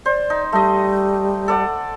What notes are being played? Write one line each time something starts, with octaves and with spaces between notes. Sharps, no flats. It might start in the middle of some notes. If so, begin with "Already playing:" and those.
C5 D5
D#4
G3 A3 D#5
A4 D5 F#5